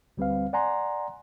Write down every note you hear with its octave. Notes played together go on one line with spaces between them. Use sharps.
D2 G3 C4 B4 F5
D5 F#5 G#5 A#5 C6